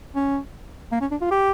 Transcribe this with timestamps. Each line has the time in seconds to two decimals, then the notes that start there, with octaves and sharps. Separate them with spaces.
0.15 C#4
0.92 A#3
1.01 C#4
1.11 D4
1.21 F4
1.31 G4